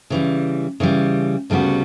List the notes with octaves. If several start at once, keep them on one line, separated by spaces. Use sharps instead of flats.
C#3 E3 G3
C#3 E3 G3
D2 C#3 G3 B3 F#4